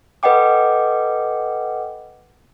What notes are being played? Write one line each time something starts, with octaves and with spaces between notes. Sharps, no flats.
A4 B4 D#5 F#5 G5 D6